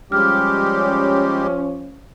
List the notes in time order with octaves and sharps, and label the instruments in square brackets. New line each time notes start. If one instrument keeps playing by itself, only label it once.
[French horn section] F3 C#4 [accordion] G3 G#3 G4 [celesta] F6